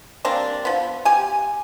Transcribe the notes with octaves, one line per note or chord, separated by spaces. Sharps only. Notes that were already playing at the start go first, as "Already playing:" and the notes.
G3 A#3 C4 D4
F3 B3
G4 G#5